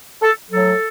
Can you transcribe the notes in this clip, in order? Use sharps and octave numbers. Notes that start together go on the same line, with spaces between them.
A4
A2 F#3 A4